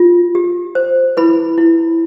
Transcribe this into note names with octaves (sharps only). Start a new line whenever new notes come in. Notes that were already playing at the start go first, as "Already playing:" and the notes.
Already playing: F4
G4
C5
E4 B4 B5
E4